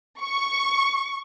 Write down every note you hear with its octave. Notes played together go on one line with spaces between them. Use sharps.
C#6